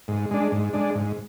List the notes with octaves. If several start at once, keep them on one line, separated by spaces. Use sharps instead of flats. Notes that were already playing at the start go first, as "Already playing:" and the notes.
G#2
G#3 D4
G#2
G#3 D4
G#2